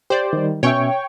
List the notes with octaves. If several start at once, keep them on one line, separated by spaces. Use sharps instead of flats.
G4 C5 D5
D#3 G3
B2 C#4 C#5 E5 G5 C#6